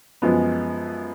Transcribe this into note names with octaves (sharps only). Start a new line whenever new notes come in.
F#2 F3 G#3 B3